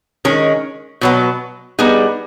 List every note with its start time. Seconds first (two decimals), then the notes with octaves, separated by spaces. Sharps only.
0.25 D#3 G#3 C#4
1.01 B2 F#3 B3
1.79 G3 B3 D#4 G#4